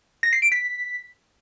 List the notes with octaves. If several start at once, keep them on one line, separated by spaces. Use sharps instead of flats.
A#6
C7
D7
B6